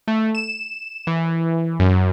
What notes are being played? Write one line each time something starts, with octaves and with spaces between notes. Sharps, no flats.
A3
E7
E3
F#2